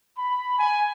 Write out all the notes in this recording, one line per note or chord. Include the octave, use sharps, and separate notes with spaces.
B5
G#5